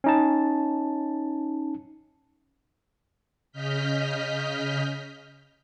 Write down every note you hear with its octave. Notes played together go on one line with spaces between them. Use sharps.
C#4 D#4 A5
C#3 D#5 F6 G6 B6